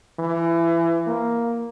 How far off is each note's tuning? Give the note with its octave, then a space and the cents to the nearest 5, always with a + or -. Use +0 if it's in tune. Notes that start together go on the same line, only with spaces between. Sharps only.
E3 +25
A#3 +5